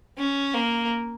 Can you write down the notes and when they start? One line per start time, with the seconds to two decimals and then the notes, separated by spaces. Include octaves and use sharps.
0.18 C#4
0.54 A#3